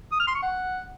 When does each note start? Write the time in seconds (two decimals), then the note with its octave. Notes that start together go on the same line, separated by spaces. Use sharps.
0.12 D#6
0.19 F6
0.27 C6
0.35 C#6
0.42 F#5